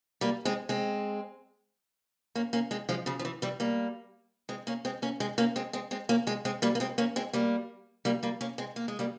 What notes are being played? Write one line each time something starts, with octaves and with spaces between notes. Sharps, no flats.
G3 A#3
G#3 C4
G#3 C4
A#3 C#4
A#3 C#4
G#3 C4
F3 G#3
C#3 F3
F3
E3
E3 G3
G3 A#3
G#3 C4
A#3 C#4
G#3 C4
A#3 C#4
G#3 C4
A#3 C#4
G#3 C4
G#3 C4
G#3 C4
A#3 C#4
G#3 C4
G#3 C4
G3 A#3
A#3
G#3 C4
A#3 C#4
G#3 C4
G3 A#3
G3 A#3
G3 A#3
A#3 C#4
G#3 C4
A#3
G#3
G3 A#3